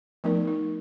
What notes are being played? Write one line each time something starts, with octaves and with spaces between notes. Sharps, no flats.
F3 A3 B3 D#4 A#4 D5
D#4